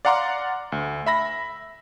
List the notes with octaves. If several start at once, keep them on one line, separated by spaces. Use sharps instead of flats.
D5 F5 F#5 A#5 C6 D6
D2
E5 B5 A#6